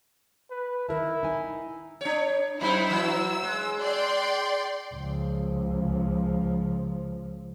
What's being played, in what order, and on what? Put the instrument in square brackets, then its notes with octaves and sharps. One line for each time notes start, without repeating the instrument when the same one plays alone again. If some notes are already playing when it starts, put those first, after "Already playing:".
[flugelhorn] B4
[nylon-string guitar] D#3 A#4 A5 [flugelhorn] E4
[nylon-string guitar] D#4 G#5
[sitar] D4 C#5
[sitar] F#2 D#4 [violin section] E4 C5
[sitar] E3 F#3 [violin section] E6
[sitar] G#3
[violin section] D5 G5 C6
[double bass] C#2 F3